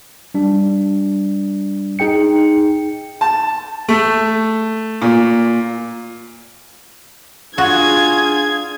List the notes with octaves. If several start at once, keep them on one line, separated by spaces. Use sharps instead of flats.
G3 D4
D#4 G#4 G5 C#7
A5
A3
A#2
D4 F4 F#4 G#4 G#6